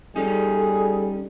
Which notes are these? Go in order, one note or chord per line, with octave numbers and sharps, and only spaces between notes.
G3 C#4 D#4 G#4 A4